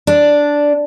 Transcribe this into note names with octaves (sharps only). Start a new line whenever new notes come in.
D4